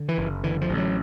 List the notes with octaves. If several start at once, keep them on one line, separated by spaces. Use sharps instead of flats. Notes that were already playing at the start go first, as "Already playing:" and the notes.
Already playing: D3
E3
F#1
D3 E3
F3
A1
F#3